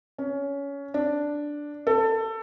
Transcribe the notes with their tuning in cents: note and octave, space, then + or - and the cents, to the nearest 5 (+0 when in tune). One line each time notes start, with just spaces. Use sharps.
C#4 +20
D4 +0
A4 +20